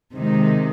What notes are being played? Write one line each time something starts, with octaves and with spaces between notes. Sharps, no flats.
C3 D#3 G#3 D#4